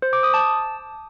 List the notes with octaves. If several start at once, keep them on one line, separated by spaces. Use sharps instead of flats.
C5
D6
D#6
A5